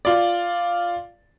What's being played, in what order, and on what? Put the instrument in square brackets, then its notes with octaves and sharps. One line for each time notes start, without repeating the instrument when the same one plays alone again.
[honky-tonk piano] F4 D5